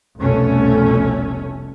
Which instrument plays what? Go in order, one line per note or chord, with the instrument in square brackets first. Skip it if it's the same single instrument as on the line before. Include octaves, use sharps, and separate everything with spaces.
[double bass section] F1 C2 B2 A3 C#4